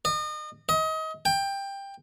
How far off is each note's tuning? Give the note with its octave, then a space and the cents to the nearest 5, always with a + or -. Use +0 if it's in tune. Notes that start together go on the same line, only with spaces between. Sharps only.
D#5 -35
D#5 +30
G5 +15